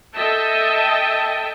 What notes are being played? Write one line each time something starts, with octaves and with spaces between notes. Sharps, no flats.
A4 D#5 E5 G5 A5